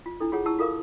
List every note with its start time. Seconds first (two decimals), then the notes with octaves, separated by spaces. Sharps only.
0.06 F4
0.20 D4 E4 A4
0.32 F4 G#4 C#5 F#5
0.45 E4 G4 A5 E6
0.59 F4 A4 A#4 F5 D6